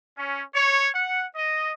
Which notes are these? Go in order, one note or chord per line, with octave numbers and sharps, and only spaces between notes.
C#4
C#5
F#5
D#5